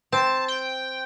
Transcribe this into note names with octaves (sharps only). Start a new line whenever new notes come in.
C4 A5
G5